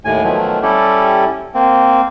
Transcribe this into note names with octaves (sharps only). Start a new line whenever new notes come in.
D#2 A2 G#5
B2 D#3 F3 F#3 A3
G3 C#4 E4 G4 A4
A#3 C4